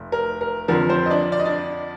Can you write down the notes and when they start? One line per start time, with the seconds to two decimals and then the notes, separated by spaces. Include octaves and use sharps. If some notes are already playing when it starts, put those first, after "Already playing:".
Already playing: F1
0.12 A#4
0.41 A#4
0.68 F2 D3 F3 A#4
0.81 A#4
0.89 C4 C5
1.06 D#5
1.10 D4 D5
1.32 D5
1.39 D#5
1.45 D4 D5